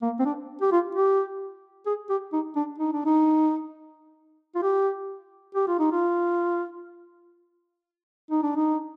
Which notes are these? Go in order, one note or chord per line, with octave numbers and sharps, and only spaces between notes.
A#3
C4
D4
G4
F4
G4
G#4
G4
D#4
D4
D#4
D4
D#4
F4
G4
G4
F4
D#4
F4
D#4
D4
D#4